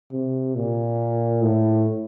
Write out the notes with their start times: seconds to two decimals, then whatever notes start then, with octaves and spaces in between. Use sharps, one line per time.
0.12 C3
0.55 A#2
1.42 A2